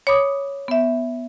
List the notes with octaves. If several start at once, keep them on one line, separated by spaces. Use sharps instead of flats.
C#5 B5 D6 D#6
B3 E5